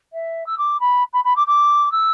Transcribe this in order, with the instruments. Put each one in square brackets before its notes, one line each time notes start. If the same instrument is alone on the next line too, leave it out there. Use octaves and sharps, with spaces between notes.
[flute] E5
E6
D6
B5
B5
B5
D6
D6
E6